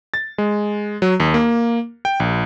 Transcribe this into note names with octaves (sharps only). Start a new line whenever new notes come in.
A6
G#3
F#3
D#2
A#3
G5
A#1